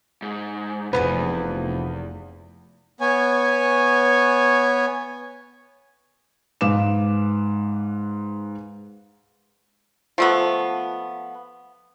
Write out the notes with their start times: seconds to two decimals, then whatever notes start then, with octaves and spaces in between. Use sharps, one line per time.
0.22 G#2
0.93 F1 E2 F3 B3 B4 G#5
3.01 B3 C#5 G#5
6.61 G#2 B4 F5 D6 E7
10.18 F3 A3 B3